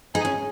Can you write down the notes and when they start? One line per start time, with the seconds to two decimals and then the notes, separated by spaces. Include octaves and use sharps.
0.14 D#4 G#4
0.25 C#4